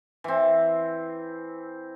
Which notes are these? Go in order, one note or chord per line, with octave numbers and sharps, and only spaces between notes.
E3 C4